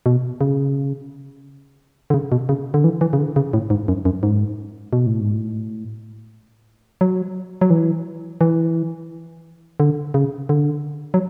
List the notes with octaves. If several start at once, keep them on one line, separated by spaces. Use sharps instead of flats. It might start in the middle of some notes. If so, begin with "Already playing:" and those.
B2
C#3
D3
C#3
B2
C#3
D3
E3
E3
C#3
D3
C#3
A2
G#2
F#2
F#2
G#2
B2
A2
G#2
A2
F#3
F#3
E3
E3
D3
C#3
D3
F#3